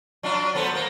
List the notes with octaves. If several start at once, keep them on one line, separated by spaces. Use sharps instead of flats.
F#3 D4 F4
F#3 B3 A4 C5
A#3